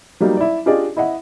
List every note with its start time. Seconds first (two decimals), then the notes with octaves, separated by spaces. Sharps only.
0.20 F#3 G3 A#3 D#4
0.37 E4 D5
0.66 D4 F4 G4 G#4 D5 D#5
0.97 E4 D#5 F#5